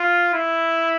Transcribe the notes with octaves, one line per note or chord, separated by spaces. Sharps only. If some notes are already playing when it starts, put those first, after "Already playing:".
Already playing: F4
E4